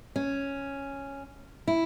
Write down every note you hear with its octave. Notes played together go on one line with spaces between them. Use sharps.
C#4
E4